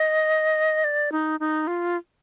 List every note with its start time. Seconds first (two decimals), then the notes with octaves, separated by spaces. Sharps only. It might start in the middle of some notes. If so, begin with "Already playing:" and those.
Already playing: D#5
0.84 D5
1.12 D#4
1.40 D#4
1.67 F4